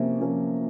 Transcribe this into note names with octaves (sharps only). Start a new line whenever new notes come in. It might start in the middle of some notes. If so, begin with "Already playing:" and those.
Already playing: C3 F3 A#3 C#4
F3 A#3 C#4 F4